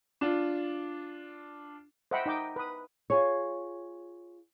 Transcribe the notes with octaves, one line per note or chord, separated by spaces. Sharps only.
D4 F4
C5 D#5 E5 F#5 G5 B5
D#4 D#5 G5 D6
B4 D#6
F4 G#4 C#5